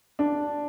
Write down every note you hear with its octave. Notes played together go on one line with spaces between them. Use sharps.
D4